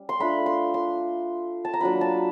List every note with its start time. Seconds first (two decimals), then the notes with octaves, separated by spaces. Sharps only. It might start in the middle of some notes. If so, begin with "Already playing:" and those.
Already playing: G3 C#4
0.09 C6
0.20 A3 D4 F4 B5
0.46 C6
0.74 C6
1.65 A5
1.73 A#5
1.81 F#3 A#3 D4 F4 B5
2.01 A5